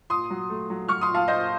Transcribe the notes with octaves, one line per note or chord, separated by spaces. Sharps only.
A#2 C6 D#6
F#3
A3
F#3
F#3 C#6 F6
C6 D#6
A#2
F5 A5
A#2 C5 D#5